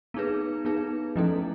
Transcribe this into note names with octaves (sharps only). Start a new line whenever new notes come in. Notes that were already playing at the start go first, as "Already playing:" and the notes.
B3 D#4 G#4 B4
B3 D#4 G#4 B4
F3 A3 C#4 E4 A4